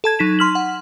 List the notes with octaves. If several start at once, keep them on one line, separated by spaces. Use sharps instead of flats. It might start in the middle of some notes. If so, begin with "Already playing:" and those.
A4 A5 G#6
F#3 D#4 B6 E7
C6 F6 F#7
F#5